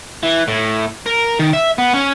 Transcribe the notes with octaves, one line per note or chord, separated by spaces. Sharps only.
E3
A2
A#4
D#3
E5
B3
C#4